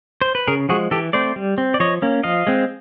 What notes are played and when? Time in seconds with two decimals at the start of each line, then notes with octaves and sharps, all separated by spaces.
0.22 C5
0.35 B4
0.47 C#3 G#4 A#4
0.69 F3 G#3 F#4 G#4
0.91 E3 G4 A4
1.13 A3 C4 C5 D5
1.36 G3
1.58 C4
1.74 D5
1.80 F3 C#5 D#5
2.02 A#3 C#4
2.23 F3 D#5 F5
2.47 G#3 C4